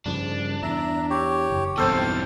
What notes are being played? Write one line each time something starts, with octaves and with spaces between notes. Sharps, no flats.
G2 C#3 F3 D4
E2 E5 A#5
G4 C#5
F#1
B1 E2 G2 C4 A4 C5 G5 F6